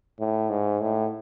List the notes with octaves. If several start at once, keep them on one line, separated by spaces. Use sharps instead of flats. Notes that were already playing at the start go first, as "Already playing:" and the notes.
A2
G#2
A2